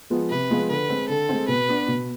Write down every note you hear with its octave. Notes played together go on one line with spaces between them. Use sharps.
F3 G#3 B3 F4
C3 B4
F3 G#3 B3 F4
D3 B4
G#3 C4
D3 A4
G#3 C4
B2 B4
B3 D4
B2